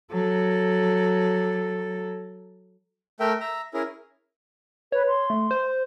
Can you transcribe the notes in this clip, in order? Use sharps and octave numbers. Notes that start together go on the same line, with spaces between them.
F#3 A4
A3 A#4 E5 G5
E5 A#5
C#4 E4 G#4 A#4
B4 C#5
C6
A3
C5